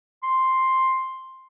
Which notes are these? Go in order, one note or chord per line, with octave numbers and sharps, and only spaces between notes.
C6